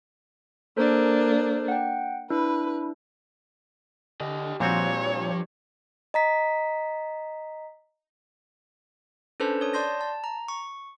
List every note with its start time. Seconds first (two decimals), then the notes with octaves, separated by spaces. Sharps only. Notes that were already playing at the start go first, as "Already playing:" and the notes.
0.77 A#3 D4 A4 A#4 C5
1.68 F#5 G5
2.30 D4 E4 B4
4.20 D3 G4 D#5
4.60 C2 G2 A#2 F3 C4 F#4 C#5
6.14 D#5 A#5 B6
9.40 C#4 D4 A4 B4 C5 A5
9.61 C#5 D#6
9.73 D5 A5 C6 G6 A#6
10.01 A5
10.24 A#5
10.48 C#6